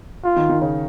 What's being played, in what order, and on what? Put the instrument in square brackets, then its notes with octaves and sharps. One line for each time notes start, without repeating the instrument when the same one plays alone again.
[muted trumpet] F4
[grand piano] D#3
D#3
C#3